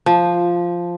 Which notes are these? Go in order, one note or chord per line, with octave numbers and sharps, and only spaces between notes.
F3